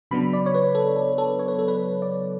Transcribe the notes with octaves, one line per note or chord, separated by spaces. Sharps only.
C#3 F#3 B3 D4 B5
D5
C#5
B4
A4
A4
A4
C#5
B4
A4
B4
D5